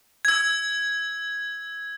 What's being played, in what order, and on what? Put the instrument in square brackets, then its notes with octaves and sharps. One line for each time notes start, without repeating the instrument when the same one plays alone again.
[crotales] E6 G#6